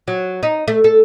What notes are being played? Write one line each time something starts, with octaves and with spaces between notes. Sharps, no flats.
F#3
D#4
A3
A4